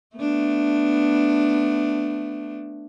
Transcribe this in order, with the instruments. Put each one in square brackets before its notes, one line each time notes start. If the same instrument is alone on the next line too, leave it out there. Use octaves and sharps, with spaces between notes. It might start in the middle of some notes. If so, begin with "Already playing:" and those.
[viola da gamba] A3 B3 D4